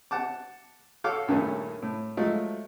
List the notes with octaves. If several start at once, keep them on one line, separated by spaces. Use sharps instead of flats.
F#5 A5 D6
F#4 A4 C#5 F5 D6
A#1 G2 A#2 D#3 A3 C#4
A2
F3 F#3 G#3 A3